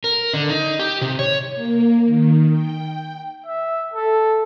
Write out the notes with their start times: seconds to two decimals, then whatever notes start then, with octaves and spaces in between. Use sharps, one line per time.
0.04 A#4
0.34 D3
0.50 D#4
0.80 G4
1.01 C3
1.19 C#5
1.55 A#3
2.06 D#3
2.52 G5
3.46 E5
3.94 A4